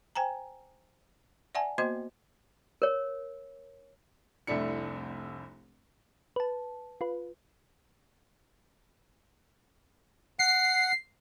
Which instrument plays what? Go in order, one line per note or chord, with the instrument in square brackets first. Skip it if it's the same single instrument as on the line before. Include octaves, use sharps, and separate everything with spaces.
[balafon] C5 G5 G#5 A#5
D5 E5 F#5 G#5 A5
A#3 B3 F#4 C5 D#5 C6
[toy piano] A#4 C#5
[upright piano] F1 C2 A3 D4 E4 C#7
[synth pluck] B4 A5
F4 B4
[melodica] F#5 [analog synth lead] C7